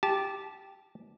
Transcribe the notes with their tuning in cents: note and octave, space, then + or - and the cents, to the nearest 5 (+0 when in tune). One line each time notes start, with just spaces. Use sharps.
G4 +0 A5 -20